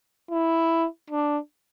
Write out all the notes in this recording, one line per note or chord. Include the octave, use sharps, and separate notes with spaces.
E4
D4